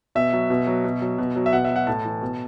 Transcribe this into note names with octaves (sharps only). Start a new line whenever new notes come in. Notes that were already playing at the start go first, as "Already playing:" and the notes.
B2 E5
F#3
B2
F#3
B2
F#3
B2
F#3
E5
B2 F#5
E5
F#3
F#5
A2 A5
E3
B2